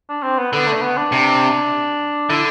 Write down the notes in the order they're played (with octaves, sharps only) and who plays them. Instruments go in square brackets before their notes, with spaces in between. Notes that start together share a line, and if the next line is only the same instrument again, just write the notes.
[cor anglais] D4
C4
B3
[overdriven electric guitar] D3 [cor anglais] B3
[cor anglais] A3
B3
D4
[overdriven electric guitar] C3
[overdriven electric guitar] D3 [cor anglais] E4